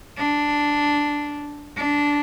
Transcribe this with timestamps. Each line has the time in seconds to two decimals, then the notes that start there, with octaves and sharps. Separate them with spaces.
0.18 D4
1.78 D4